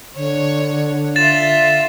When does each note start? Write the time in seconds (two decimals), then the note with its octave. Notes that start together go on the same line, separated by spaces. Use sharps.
0.16 D3 C#5
1.16 F4 E5 A6 E7